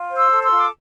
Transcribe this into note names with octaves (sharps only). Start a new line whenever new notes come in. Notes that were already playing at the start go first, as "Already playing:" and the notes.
Already playing: F4
C5
C6 E6
A4
C6 E6
F4
D6